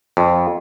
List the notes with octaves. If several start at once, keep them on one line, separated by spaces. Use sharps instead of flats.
F2